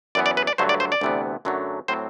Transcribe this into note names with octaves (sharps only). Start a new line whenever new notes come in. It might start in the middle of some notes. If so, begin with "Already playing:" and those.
F#2 E3 B3 D5
D5
B4
D5
G2 D3 F#3 A3 C5
D5
C5
D5
D2 C3 E3 B3
F#2 D3 F#3 A3
A2 F#3 C4 C5